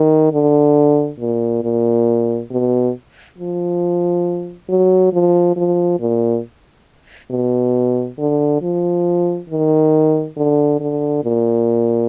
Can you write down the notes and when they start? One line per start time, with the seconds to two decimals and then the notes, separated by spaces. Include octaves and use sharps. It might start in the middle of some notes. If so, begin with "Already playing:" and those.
Already playing: D#3
0.33 D3
1.20 A#2
1.63 A#2
2.51 B2
3.38 F3
4.69 F#3
5.13 F3
5.56 F3
6.00 A#2
7.31 B2
8.18 D3
8.62 F3
9.49 D#3
10.37 D3
10.80 D3
11.24 A#2